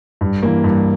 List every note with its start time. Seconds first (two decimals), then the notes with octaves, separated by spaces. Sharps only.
0.21 G2
0.43 E3 A#3
0.64 G2